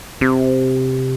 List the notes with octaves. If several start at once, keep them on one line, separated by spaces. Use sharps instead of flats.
C3